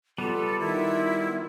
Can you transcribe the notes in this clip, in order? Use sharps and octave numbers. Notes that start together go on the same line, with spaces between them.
G3 B3 F4 A4
D#3 E4